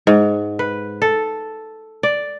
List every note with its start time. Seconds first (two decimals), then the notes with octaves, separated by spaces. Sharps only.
0.07 G#2
0.59 B4
1.02 A4
2.03 D5